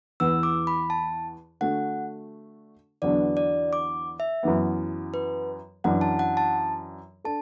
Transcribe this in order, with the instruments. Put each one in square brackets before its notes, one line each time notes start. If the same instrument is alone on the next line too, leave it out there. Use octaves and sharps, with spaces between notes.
[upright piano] E2 E3 B3 [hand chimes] E6
[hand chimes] D6
B5
A5
[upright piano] D3 A3 F#4 [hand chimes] F#5
[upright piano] E2 D3 F#3 B3 D4 [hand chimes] D5
[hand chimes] D5
D6
E5
[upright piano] F#2 E3 B3
[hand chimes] B4
[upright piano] F#2 E3 D4 [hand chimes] F#5
[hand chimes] A5
F#5
A5
[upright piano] D4 A4 [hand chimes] A5